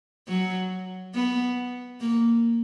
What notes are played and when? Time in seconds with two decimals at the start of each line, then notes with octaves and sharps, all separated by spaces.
0.28 F#3
1.14 B3
2.01 A#3